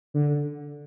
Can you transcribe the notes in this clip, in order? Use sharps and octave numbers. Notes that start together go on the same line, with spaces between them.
D3